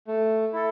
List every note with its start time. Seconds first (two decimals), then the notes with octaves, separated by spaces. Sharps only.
0.08 A3
0.53 E4 A4